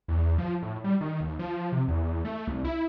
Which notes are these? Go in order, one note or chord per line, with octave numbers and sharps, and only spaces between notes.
E2
F3
A2
G3
D#3
D#2
F3
C3
E2
A3
C2
E4